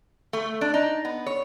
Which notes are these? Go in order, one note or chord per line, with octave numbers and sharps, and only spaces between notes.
A3
D4
D#4
B3
C#5